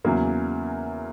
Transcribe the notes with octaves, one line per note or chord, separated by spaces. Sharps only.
E2 C#3 F#3 A#3